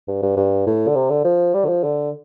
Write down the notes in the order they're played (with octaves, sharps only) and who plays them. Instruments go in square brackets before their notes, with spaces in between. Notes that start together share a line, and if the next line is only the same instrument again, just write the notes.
[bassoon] G2
G2
G2
A2
D3
C3
D3
F3
G3
D3
F3
D3